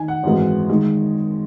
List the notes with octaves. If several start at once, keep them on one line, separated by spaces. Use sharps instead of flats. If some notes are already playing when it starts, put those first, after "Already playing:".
Already playing: D#3 G#5
F#5
G#1 F#2 E3 G#3
D#3 G#3